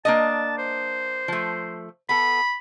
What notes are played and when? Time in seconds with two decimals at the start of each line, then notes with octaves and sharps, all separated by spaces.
0.05 A#3 D4 D#5 A5
0.58 C5
1.28 F3 A3
2.09 B3 A4 B5